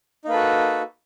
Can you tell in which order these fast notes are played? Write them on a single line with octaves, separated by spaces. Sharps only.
D#4 A#3 B4 A4 F#4